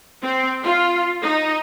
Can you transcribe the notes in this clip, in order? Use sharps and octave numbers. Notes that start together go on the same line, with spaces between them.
C4
F4
D#4